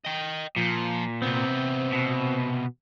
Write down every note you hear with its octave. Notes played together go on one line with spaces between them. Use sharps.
D#5 G5
A#2 F3
C3 B3 C4
B2